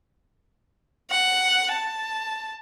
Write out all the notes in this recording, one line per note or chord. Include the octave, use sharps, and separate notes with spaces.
F#5
A5